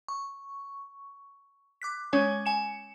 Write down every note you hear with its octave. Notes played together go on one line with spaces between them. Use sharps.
C#6
D6 F#6 B6
G#3 C#4 C#5 G#5
G#5 C#7 E7